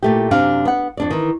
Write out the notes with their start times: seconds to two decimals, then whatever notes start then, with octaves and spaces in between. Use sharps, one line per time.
0.03 A#2 A3 G4
0.31 F#2 C3 D4 F5
0.65 B3 F#5
0.97 F2 D4 D5
1.10 D#3 E3